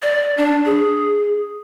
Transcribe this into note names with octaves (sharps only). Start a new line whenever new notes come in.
D5
D4
G#4